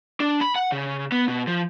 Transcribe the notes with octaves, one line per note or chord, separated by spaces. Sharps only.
D4
B5
F#5
C#3
B3
B2
F3